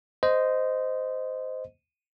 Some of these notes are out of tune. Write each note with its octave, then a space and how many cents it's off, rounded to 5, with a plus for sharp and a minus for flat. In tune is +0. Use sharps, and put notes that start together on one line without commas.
C5 -15 D#5 +0